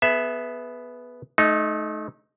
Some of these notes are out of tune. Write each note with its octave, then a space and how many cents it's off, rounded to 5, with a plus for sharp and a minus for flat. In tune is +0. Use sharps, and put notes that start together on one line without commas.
B3 +0 G#4 +35 E5 +0
A3 -30 D#4 +0